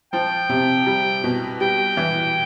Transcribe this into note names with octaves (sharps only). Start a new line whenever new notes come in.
F3 G5
C3
G3
B2
G3 G5
E3